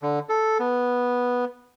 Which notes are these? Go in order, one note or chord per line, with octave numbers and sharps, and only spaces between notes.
D3
A4
B3